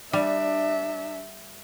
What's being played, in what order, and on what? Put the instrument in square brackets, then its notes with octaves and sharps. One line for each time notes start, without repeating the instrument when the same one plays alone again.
[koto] G3 [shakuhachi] D4 [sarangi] E5